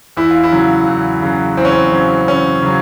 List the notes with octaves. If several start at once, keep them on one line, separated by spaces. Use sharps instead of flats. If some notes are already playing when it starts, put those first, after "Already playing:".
E2 E4
F4
E4
C#3 F#3
E2
C#3 F#3
E2 C4
C#4
C4
C#3 F#3
E2 C#4
C#3 F#3